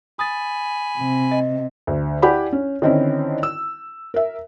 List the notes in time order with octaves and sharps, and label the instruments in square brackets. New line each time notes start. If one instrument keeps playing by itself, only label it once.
[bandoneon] G#5 B5 [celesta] D#6 A6
[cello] C3
[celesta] D#5
[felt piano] D2
E4 G4 D5 F#5 G#5 B5
C#4
D3 D#3 C4 C#4 D#4 E4
E6
A#4 E5